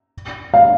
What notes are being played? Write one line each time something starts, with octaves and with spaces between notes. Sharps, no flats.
F5